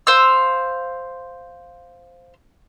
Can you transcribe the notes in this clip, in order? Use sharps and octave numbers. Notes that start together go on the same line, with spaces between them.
C5 F5 E6